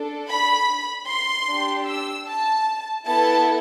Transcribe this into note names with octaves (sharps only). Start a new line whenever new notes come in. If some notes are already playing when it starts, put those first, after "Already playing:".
Already playing: D4 A4
B5
C6
D4 G4
E6
A5
B3 E4 A4 A5